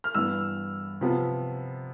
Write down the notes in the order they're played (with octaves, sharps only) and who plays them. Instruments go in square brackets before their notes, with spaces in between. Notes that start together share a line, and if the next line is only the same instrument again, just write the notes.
[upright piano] F6
G2 E3 B3 E6
C3 F3 B3